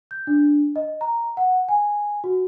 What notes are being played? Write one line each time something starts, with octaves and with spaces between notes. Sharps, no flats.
G6
D4
D#5
A#5
F#5
G#5
F#4